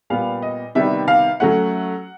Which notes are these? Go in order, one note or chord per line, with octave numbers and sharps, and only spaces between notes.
A#2 G3 B3 F5
D#5
C3 D#3 G3 B3 E5
F5
F#3 A3 C#4 F#5